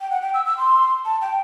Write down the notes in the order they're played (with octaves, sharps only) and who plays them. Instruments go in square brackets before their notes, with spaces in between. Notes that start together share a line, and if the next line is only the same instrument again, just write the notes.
[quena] G5
F#5
G5
E6
E6
C6
A5
G5